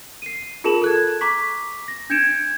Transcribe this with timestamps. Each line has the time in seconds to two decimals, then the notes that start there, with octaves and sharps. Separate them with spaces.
0.22 C7 D#7
0.64 F4 G#4 A#4 A5 E7 F#7
0.82 A4 F#6 G#6
1.21 A#5 C#6 D6 B6
1.88 A#6
2.10 D4 G6 G#6 C#7 D7 E7